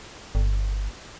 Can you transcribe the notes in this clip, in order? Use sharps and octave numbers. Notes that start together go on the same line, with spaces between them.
G1